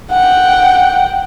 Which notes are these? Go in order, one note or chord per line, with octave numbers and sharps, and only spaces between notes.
F#5 G5